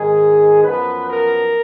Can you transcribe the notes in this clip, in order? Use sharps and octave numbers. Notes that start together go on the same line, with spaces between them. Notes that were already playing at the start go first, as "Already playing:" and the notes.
Already playing: G#2 D#3 G#3 G#4
F#2 F3 B3 B4
A#4